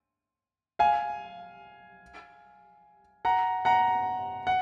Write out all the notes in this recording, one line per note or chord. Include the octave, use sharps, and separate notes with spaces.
F5 G#5
F#5 A#5
F#5 A#5
F#5